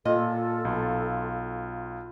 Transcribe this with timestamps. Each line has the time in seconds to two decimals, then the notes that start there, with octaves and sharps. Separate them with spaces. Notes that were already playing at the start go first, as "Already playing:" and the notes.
0.05 A#2 F4 A4 D#5
0.65 B1